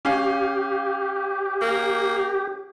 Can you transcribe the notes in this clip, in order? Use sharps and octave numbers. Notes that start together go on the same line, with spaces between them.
C#4 G4 F5
A#3